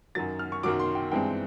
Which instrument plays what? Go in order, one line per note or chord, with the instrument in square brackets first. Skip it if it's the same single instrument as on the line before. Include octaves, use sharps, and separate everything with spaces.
[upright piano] F#2 D#3 F#3 A6
F6
C#6
F#2 D#3 F#3 D6
C6
G5
G2 E3 G#3 C4 G5